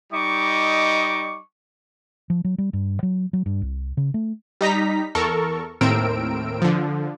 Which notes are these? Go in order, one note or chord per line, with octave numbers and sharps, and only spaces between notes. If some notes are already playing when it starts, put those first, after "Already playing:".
G3 D#4 D#5 C#6 D6
F3
F#3
G3
G2
F#3
F#3
G2
C2
C#3
A3
G3 D#4 A#5 B6
E2 A4 A#4 C#6
D#2 A2 C4 A#4 E6 D7
D3 F3